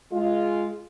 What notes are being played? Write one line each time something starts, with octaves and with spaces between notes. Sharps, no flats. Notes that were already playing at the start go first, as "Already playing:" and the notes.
G#3 F4